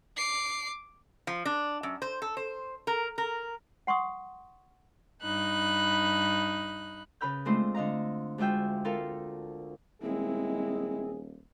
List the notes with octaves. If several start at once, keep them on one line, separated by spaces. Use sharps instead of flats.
D6 C7
F3
D4
F#2
C5
A4
C5
A#4
A#4
F#5 C6 C#6 D#6
G2 D#4 B5 F#6
C#3 B4 B5 F6 G6
G#3 A3 C4 D4 F4 C5
D3 D#5 F5 A#5
D2 G#3 F4 E5 G5
C4 F4 A4 A#4 F5
D#1 G#3 C4 E4 G#4